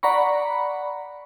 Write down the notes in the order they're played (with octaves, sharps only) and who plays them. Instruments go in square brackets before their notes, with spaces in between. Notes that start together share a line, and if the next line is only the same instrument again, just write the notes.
[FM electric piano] D5 F#5 A#5 B5 C#6